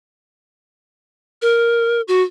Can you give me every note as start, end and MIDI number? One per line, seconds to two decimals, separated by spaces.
1.42 2.01 70
2.08 2.22 66